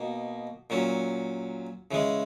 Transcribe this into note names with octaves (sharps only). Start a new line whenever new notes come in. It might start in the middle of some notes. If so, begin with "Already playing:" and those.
Already playing: B2 A#3 D#4
A#2 F#3 C#4
C#3 E3 G#3